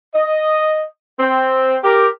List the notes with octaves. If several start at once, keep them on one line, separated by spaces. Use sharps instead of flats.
D#5
C4
G4 A#4